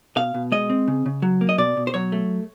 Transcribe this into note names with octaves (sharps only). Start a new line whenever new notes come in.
B2 F5
B2
G#3 D#5
C4
C#3
C#3
F#3
A#3
D#5
B2 D5
B2
C5
F#3 C#5
A3